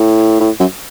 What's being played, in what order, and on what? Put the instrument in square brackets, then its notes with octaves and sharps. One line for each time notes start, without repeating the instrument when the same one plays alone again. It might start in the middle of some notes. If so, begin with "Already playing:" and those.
Already playing: [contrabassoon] A2
A2
F#2